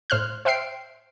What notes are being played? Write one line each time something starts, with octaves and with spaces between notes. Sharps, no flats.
A2 C5 F6 F#6
C5 E5 G5 F6 C7 D7